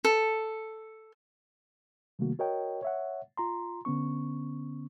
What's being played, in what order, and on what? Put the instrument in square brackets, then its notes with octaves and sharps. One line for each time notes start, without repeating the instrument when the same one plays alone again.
[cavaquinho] A4
[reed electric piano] C3 D#3 G3 A3 A#3 F#4
F#4 A#4 C#5 D#5 G5
C#5 E5 F#5
F4 A#5 C6
D3 B3 C#4 C#6